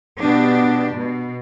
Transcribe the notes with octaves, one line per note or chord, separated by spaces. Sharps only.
B2 B3 D4 G4
B2